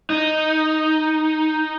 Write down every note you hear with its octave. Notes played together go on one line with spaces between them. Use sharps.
D#4